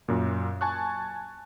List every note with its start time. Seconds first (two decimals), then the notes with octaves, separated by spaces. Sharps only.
0.08 F#2 A#2
0.61 G#5 A5 C#6 F#6